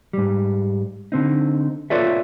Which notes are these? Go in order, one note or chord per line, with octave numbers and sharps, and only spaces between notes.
G#2 G3
D3 C4 D#4
F4 A4 B4 C#5 D5 E5